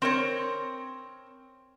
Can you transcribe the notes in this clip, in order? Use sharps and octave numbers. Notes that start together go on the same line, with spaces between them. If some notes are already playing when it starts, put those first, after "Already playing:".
C4 A#4 C#5